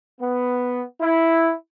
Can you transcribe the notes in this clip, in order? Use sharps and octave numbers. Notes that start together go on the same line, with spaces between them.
B3
E4